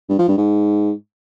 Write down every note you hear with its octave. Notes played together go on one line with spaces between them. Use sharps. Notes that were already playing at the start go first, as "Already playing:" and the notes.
G2
F3
G2
G#2